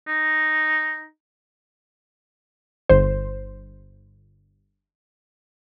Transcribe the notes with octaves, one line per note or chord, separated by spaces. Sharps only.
D#4
G1 C5